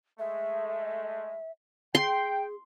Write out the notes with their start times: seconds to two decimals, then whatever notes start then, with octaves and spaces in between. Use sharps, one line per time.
0.19 G#3 A3 E5
1.95 G#4 G5 C6